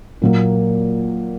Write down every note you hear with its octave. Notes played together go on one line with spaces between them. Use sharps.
A#2 F#3 A#3